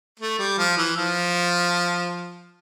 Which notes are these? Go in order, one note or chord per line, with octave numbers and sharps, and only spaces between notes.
A3
G3
F3
E3
F3